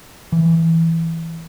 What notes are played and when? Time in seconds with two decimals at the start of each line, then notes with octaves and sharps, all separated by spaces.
0.32 E3